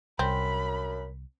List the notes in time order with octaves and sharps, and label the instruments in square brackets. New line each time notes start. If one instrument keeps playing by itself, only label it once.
[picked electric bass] C2 [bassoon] F#2 [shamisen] C4 [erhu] B5